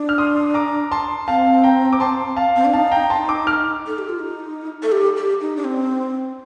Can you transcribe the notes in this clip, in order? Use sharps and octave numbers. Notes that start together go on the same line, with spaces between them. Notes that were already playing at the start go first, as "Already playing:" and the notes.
Already playing: D4
F6
C6 D#6
A#5 D6
A5 C6
C4 F5 A5
G5 A#5
D6
A5 C6
F5 A5
C4
D4
D#4 F5 A5
G5 A#5
A5 C6
A#5 D6
D6 F6
A4
G4
F4
D#4
A4
G4
G4
D#4
D4
C4